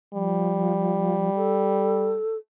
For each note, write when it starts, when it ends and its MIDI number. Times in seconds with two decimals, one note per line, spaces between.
0.14 1.30 53
0.14 2.18 55
1.36 2.36 69